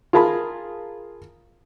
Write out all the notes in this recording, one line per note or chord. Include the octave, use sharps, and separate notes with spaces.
F4 G#4 A#4 A5 B5